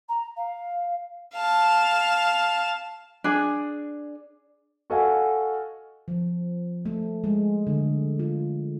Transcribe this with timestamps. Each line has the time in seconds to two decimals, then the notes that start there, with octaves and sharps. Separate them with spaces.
0.08 A#5
0.36 F5
1.34 F5 A5
3.24 D4 G#4
4.90 F#4 A4 D#5 F5 F#5 G#5
6.08 F3
6.85 A3
7.24 G#3
7.67 D3
8.19 F4